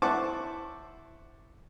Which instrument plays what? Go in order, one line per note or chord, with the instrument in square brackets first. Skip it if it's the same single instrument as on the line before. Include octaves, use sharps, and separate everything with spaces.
[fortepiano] E4 C5 F#5 A5 C#6 D6